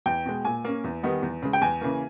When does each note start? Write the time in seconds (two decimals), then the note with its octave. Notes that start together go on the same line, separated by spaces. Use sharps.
0.06 E2 G5
0.26 B2 G#3
0.45 A#2 G#5
0.65 A#3 C#4
0.84 E2
1.03 D#3 G3 B3 D#4
1.22 E2
1.42 C#3 G#3
1.53 G5
1.61 E2 G#5
1.81 C#3 E3 A#3